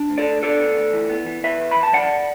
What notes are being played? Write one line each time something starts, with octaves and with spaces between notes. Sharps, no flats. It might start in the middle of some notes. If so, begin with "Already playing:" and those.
Already playing: D4
D2
A4 D5
D3
B3 A4 D5
D2
D2
E3
B3
E3
E2 B4 E5
E2
E3 B5
A5
F#2 D5 F#5